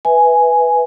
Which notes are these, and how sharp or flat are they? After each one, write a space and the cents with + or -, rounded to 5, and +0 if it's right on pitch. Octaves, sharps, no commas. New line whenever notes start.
B4 +0 E5 -10 G#5 +0